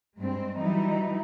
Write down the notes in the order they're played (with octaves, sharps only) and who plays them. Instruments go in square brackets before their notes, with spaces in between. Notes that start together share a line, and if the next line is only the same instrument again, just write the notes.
[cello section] G2 G#3 C4
E3 F#3 G3 D#4 E4